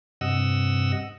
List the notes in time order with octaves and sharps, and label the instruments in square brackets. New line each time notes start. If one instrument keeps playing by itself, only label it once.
[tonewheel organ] G2 C3 D#5 F#5 E6